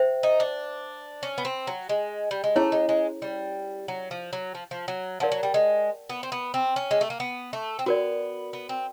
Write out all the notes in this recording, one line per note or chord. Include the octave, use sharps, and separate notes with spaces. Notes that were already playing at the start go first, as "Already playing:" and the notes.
Already playing: C5 E5 G5
D#4
D4
C#4
B3
C4
F#3
G#3
G3
G#3
A3 C#4 E4 G#4 C#5
G#3
G#3
G3
F#3
F3
F#3
F3
F3
F#3
F3 A#4 D5 F#5 A5
F#3
G3
G#3
B3
C4
B3
C4
C#4
G#3
A3
A#3
B3
A3
C4
B3 F#4 A#4 D5
B3
C4